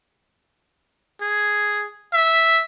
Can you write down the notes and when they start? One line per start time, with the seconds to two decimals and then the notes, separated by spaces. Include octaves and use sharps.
1.21 G#4
2.13 E5